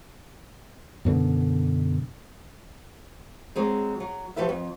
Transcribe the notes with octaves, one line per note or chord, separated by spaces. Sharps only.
F#2 B2 D3
F#3 G#3 C4
F#3
F3 F#4 G4 B4 E5
F2